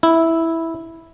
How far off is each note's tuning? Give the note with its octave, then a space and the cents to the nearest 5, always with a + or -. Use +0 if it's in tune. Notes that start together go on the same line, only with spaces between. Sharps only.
E4 -5